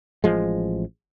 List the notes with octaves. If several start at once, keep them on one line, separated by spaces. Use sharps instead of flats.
A1 F3 G#3